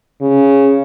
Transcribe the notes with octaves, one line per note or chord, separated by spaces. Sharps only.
C#3